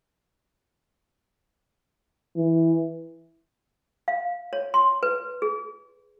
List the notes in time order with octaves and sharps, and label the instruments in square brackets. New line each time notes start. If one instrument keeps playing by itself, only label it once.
[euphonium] E3
[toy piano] F5
C#5
C6
B4
G#4